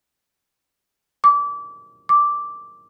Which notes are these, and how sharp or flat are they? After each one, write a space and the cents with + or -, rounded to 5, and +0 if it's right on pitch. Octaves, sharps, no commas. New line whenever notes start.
D6 -25
D6 -5